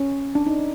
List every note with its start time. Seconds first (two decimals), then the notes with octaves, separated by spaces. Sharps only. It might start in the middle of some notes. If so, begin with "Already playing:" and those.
Already playing: C#4
0.35 D4
0.46 D#4